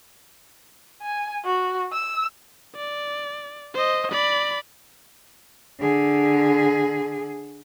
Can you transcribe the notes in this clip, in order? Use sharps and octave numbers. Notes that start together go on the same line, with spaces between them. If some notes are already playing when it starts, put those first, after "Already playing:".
G#5
F#4
E6
D5
C5 D#5
D5 B5
D3 G#4